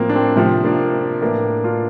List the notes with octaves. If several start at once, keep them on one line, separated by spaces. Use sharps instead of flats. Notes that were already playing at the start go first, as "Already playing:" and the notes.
Already playing: A2 F3 A#3 C4
D4
C4
C3 F3 C4
A#3 D4
C4
A2 E3 A#3 D4
D4 F4